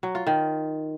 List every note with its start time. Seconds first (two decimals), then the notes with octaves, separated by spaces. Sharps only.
0.03 F#3
0.15 F4
0.27 D#3